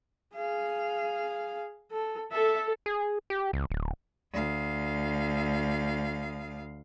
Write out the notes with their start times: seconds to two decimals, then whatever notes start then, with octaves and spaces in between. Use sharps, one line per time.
0.36 G#4 F5
1.92 A4
2.32 A4 E5
2.86 G#4
3.30 G4
3.53 C#2
3.70 D1
4.32 D2 F5